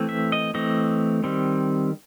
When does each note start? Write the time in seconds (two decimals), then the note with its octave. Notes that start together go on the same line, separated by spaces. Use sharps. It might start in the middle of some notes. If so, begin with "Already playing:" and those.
Already playing: E3 A3 C4
0.09 E5
0.32 D#5
0.54 E3 A3 C4 D#5
1.24 D#3 G3 C4